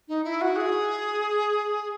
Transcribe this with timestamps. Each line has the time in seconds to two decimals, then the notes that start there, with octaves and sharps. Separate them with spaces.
0.08 D#4
0.24 E4
0.41 F#4
0.56 G#4